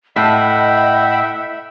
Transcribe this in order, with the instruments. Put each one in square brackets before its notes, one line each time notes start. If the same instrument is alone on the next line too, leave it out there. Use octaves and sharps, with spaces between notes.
[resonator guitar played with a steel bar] A2 [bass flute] D#5 [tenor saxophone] E5 [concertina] F#5 G5 B5